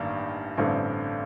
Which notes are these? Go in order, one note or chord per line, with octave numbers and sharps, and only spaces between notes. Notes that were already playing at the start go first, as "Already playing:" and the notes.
Already playing: A1 G2 D#3 A#3
A1 G2 D3 A3 C4